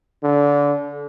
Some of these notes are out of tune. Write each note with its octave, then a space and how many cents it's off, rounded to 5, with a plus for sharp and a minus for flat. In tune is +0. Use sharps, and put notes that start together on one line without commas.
D3 -30